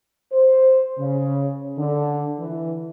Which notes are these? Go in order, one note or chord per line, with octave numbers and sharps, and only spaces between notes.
C5
C#3
D3
E3